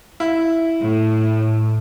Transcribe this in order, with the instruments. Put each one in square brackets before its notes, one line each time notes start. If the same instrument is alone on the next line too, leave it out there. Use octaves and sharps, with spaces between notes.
[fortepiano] E4
[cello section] A2